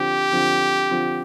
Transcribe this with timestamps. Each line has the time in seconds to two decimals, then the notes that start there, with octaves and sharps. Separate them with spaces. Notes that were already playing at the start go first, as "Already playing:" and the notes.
Already playing: D3 F3 C4 G4
0.32 D3 F3 C4
0.91 D3 F3 C4